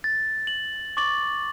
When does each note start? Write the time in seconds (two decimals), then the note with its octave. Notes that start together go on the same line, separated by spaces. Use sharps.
0.04 A6
0.47 F#7
0.97 C#6 D6 A6 F#7